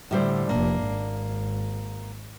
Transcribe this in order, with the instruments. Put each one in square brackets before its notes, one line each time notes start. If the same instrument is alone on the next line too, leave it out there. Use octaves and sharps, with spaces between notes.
[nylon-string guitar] A2 G3 C5 [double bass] D3
[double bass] F1 D4 [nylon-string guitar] A#3
[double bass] G#1